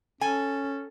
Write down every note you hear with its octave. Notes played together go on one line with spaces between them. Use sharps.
C#4 A4 G#5